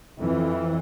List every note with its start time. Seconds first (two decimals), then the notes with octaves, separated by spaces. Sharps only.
0.19 F2 E3